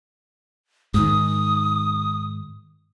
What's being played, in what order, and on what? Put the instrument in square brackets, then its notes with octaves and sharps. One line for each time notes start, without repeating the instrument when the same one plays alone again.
[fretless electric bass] G#2 D#3 [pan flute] D#6